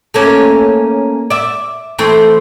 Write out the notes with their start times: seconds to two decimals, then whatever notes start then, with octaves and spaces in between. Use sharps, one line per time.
0.14 A3 A#3 C#4
1.30 D5 E5
1.98 E3 A3 C4